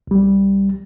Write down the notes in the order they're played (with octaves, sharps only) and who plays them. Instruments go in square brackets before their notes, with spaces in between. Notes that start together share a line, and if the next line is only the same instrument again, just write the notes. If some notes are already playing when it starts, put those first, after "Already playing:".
[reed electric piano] C2 G3